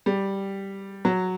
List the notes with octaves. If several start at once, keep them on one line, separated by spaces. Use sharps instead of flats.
G3
F#3